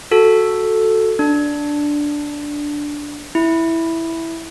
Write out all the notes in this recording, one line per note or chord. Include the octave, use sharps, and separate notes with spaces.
F#4 A4
D4
E4